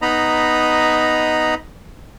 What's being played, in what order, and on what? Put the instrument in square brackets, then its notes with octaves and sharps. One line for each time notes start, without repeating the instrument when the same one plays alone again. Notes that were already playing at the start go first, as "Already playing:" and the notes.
[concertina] B3 D#4 D#5 A#5 B5